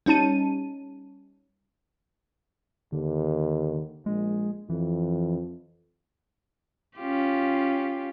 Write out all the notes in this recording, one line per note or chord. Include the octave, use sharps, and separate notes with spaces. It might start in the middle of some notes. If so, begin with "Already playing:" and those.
G3 C#4 D#4 A5 D#7
D#2 D3
A#1 G#3
F2 E3
C#4 F4 G4